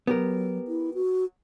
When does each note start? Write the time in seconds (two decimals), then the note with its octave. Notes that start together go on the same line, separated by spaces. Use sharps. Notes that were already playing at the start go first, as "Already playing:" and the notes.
0.07 F#3 B3 G4 A#4
0.68 E4
0.94 F#4